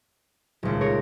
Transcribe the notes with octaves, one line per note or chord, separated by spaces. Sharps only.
D#1 C#2
G#4 A#4 C#5 A#6